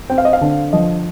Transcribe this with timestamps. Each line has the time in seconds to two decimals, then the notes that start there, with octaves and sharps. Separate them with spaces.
0.10 C4 G5
0.18 F5
0.25 D#5
0.33 F5
0.41 D3
0.73 F3 D#5